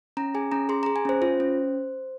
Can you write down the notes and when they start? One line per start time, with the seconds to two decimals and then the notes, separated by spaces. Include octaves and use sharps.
0.17 C#4 A#5
0.35 G#4 G#5
0.51 C#4 A#5
0.69 G#4 C6
0.83 G#4 A#5
0.96 G#5
1.05 C#4 C5
1.22 F4 C5
1.40 C#4